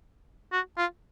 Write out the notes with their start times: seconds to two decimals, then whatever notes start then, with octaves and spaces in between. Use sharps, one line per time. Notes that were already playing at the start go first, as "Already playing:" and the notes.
0.52 F#4
0.78 F4